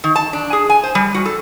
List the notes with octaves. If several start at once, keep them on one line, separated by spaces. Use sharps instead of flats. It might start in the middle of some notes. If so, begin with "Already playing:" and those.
D#3
A5
D4
G#4
G#5
C5
G3
F#4
A4